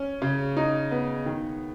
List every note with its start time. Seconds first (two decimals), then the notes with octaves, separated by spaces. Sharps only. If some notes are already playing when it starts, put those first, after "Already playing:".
Already playing: C#4
0.22 C#3
0.57 D#4
0.91 B3
1.26 D#3